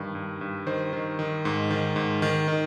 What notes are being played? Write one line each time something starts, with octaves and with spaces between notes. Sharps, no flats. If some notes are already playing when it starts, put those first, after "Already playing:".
Already playing: G2 D#3
G2
G2
D#3 C5
D#3
D#3
G#2
D#3
G#2
D#3
D#3